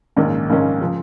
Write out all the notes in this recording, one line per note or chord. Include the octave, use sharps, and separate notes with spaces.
A#1 G#2 D#3 A#3 C#4
A#1 G#2 D#3 A#3 C#4
C#3 F3